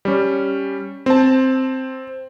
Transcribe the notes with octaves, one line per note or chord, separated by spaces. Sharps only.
G3 C#4
C4 A5